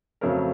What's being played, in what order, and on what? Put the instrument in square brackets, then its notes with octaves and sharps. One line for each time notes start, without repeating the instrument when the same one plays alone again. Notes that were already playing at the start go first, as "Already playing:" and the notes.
[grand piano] F2 C#3 F#3 A3 A#4